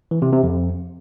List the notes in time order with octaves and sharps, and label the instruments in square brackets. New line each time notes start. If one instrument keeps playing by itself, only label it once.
[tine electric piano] E3
C3
C3
F2